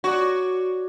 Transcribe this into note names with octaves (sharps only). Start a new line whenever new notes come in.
F#4 C#5 D5